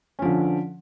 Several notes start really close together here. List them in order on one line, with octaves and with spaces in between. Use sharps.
C#4 F3 D3